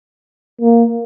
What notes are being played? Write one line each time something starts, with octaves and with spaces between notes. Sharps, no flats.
A#3